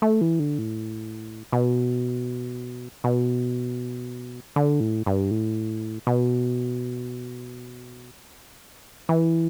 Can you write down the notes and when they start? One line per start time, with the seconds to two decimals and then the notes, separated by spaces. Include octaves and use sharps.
0.02 A3
0.21 E3
0.39 D3
0.58 A2
1.52 B2
3.04 B2
4.56 D3
4.80 A2
5.06 G2
5.31 A2
6.07 B2
9.09 E3